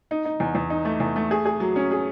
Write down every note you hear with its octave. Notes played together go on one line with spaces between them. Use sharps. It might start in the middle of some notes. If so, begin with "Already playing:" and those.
D#4
D#4
E2
E2
D#4
A3
E2
A3
G#4
G#4
F#3
C#4
G#4